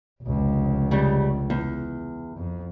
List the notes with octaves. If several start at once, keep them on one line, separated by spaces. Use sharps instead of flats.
F1 C#2
C#3 G3
E2
F2